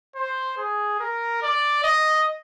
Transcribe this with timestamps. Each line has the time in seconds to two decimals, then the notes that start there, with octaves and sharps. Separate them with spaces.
0.15 C5
0.57 G#4
1.00 A#4
1.42 D5
1.84 D#5